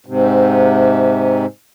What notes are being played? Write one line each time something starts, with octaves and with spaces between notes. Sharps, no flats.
G#2 C3